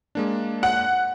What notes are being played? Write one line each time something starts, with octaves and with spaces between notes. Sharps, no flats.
G#3 A#3 D4
F#5